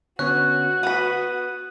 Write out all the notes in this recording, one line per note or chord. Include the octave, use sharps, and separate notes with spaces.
D3 B3 C#4 F#4 C#5 F#6
B3 B4 D#6